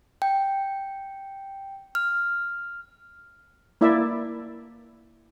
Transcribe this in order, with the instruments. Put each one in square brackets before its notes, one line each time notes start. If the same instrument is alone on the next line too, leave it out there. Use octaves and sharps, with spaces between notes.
[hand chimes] G5
F6
[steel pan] A#3 E4 D5 E5